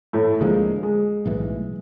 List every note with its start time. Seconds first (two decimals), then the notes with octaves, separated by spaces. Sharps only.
0.13 A2 A3
0.40 D2 D3 F3 G#3 A#3
0.83 G#3
1.26 B1 A2 E3